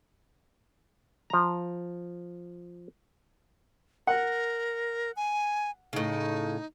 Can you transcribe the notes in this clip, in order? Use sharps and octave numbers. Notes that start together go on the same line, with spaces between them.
F3 A#5
A#4 F#5
G#5
A2 C#3 D#4